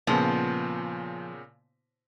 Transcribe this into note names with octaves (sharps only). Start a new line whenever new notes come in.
A#2 C#3 F3 B3